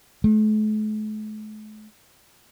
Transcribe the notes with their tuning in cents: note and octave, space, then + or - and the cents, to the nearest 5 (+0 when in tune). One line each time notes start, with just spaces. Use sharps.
A3 -45